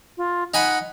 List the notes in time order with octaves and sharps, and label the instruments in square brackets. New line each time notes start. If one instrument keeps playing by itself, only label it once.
[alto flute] F4
[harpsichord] D#4 G#5 B5 [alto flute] F#5